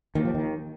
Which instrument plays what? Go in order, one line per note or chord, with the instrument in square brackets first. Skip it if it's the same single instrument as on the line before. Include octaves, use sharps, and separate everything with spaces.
[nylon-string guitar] D#2 [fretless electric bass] D#3
[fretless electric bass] F3
D#3